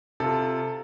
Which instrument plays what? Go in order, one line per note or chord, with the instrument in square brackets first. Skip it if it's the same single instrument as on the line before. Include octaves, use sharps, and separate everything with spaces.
[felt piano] C3 F4 [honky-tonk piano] A4